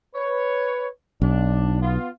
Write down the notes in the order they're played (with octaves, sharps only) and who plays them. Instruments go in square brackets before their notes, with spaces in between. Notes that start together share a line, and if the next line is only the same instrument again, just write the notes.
[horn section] B4 C#5
[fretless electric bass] B1 [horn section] D4
[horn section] B3 F4